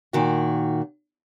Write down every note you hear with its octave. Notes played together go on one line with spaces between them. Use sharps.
A#2 D#3 F#4